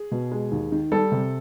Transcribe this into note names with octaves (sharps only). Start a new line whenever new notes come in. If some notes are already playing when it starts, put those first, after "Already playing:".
Already playing: G#4
B2
G#3
D#2
D#3
G3 A4
C3